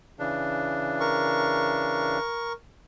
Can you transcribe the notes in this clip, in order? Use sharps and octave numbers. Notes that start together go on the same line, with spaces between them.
C#3 E3 D4
A#4 C#6